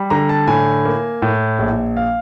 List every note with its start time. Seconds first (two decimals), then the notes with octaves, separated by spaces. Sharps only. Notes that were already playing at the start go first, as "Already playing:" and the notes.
Already playing: G3
0.10 D3 A#5
0.29 A5
0.47 A2 G#5
0.85 A#3
1.22 A2
1.59 A#1
1.97 F5